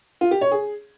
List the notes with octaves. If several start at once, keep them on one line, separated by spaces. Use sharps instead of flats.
F4
G4
C#5
G#4